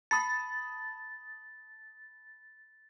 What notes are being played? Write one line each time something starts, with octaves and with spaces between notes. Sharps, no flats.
A5 B5 D#6 A6